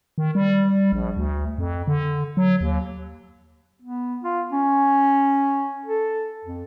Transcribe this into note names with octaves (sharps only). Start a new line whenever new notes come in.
D#3
G3
A#1
D2
F2
D3
F#3
D#2
B3
F4
C#4
A4
F2